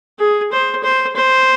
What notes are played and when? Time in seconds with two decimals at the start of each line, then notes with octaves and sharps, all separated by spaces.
0.19 G#4
0.52 C5
0.83 C5
1.16 C5